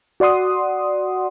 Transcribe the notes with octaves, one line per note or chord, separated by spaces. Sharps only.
F#4 D5 F#5 C6 D#6